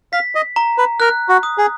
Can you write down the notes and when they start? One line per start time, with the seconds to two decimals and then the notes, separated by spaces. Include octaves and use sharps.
0.13 F5 B6
0.35 D#5
0.56 A#5
0.78 B4
1.00 A#4 F#6
1.29 F#4
1.43 D#6
1.58 G#4